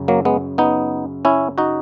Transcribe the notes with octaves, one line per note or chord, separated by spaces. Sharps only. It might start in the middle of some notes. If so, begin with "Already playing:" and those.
Already playing: F#2 C#3
F#3 A#3
G#3 B3
B3 D#4
C#4 E4
D#4 F#4